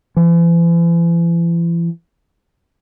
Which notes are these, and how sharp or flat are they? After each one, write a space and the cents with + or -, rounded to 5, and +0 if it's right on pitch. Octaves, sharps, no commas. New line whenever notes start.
E3 +40